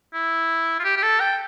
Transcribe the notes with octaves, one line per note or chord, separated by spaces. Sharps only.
E4
F4
G4
G4
A4
G5